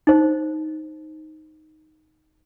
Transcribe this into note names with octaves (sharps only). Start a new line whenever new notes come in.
D#4 C5